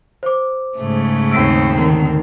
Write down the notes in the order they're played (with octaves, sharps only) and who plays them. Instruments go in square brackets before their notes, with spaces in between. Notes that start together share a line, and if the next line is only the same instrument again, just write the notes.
[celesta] C5 D6
[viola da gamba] G#2 C#3 A3
[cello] D#2 C4 [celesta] E6 D7
[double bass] D3 D#3